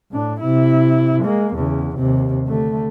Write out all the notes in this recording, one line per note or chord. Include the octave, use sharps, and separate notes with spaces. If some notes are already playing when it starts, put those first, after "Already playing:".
A2 D4
C3 E4
G#3 A#3
E2 C#3
D#2 C3
D3 A3